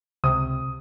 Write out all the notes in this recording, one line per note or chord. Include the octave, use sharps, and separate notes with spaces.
C#2 C3 D#6